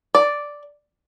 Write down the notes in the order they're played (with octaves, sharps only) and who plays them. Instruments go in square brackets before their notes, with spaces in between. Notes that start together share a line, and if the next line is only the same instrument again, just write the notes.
[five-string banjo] D5